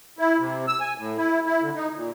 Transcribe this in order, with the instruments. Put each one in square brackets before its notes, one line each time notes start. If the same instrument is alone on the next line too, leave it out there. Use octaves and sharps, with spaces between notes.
[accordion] E4
C3
E6
G#5
A2
E4
E4
D3
D#4
A#2